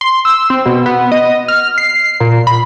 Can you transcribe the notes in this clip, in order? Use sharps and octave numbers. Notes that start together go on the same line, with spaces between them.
C6
E6
C4
B2
B3
D#5
F6
C7
A#2
B5